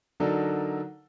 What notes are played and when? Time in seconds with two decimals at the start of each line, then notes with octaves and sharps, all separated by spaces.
0.20 D3 F#3 D4 D#4 A4 A#4